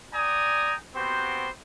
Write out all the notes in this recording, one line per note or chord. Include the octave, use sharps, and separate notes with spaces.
D5 G5 G#5 A#5 D#6
B3 C4 F#4 G4 C5